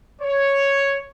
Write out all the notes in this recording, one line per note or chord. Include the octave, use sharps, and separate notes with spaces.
C#5